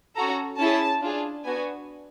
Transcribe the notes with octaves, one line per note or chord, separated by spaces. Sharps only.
C#4 F#4 A4 A#5
C#4 E4 G#4 A5
D4 F4 G#4
B3 D4 F#4 G#5